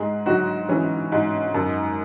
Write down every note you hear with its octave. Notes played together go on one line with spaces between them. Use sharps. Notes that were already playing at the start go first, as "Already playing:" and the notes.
Already playing: G#2 G#3 G#4
G#2 F#3 F#4
E3 C#4
G#2
F#2